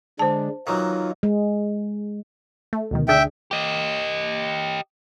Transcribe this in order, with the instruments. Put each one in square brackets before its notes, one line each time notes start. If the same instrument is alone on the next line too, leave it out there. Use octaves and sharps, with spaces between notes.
[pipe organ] D3 G#3 D4 [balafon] C5 A5
[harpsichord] D#3 E3 F#3 [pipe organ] D#4 F4
[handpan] G#3
[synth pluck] A3
D2 B2 D#3
[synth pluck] D2 D4 G#4 [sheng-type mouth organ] E5 G5
[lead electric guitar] G4 D#5